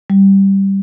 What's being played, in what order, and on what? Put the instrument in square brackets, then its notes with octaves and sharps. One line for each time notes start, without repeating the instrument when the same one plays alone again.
[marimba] G3